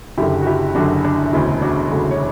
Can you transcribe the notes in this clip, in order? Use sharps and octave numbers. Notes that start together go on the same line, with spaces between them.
F#1 F#2 D3 E4 G4
F#4
E4 G4
F#1 F#2 D3 D4 F#4
D4
E1 D2 C#3 E4
D4 F#4
E1 D2 C#3 F#4 A4
C#5